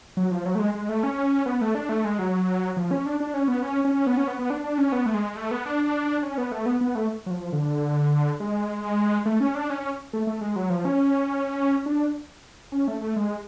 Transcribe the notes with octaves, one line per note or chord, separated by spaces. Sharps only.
F#3
F3
F#3
A3
G#3
G#3
A3
C#4
B3
A3
D4
A3
G#3
F#3
F3
C#4
D4
D4
C#4
B3
C#4
C#4
B3
C#4
B3
B3
D4
D4
C#4
B3
A3
G#3
A3
B3
D4
C#4
B3
A3
B3
B3
A3
F#3
F3
D3
G#3
A3
C#4
D4
C#4
A3
A3
G#3
F#3
F3
C#4
D4
C#4
A3
A3
G#3